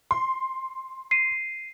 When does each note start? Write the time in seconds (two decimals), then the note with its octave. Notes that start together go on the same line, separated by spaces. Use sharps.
0.11 C6
1.11 C7 D#7